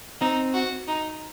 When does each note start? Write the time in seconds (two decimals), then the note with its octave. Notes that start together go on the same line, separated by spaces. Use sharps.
0.21 C4 D#4
0.54 F#4
0.88 D#4